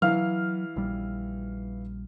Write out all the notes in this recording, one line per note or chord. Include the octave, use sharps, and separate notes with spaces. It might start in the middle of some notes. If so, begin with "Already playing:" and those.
E3 F#3 F5 F6
A#1 G3